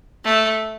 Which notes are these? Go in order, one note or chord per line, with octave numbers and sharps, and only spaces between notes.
A3